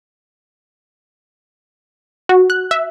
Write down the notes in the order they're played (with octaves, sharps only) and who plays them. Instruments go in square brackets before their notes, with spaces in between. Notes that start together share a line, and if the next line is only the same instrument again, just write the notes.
[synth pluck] F#4
F#6
E5